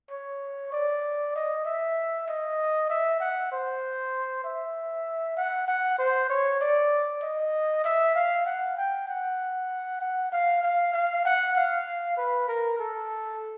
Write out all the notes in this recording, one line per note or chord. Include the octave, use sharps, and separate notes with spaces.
C#5
D5
D#5
E5
D#5
E5
F#5
C5
E5
F#5
F#5
C5
C#5
D5
D#5
E5
F5
F#5
G5
F#5
F#5
F5
F5
F5
F#5
F5
B4
A#4
A4